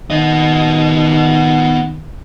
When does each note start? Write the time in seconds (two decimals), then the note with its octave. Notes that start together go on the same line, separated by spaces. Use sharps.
0.10 D#3 B3 D#5